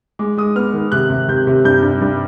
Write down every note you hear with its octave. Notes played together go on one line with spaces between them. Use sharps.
G#3 D6
G#3 D#6
B3 F6
D#3
C3 F#6
C3
C3 G6
C3
G2 G6
G2
G2